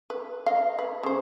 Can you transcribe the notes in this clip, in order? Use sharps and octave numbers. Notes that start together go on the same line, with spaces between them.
B4
D#5 F5
B4
C#3 C5